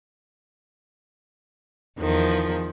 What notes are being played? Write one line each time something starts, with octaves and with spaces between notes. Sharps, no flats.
E2 D#3 F3